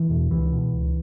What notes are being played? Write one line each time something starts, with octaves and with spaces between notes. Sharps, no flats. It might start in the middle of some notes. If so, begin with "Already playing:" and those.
Already playing: E3
E2 B2
C#2 E3
B2
C#2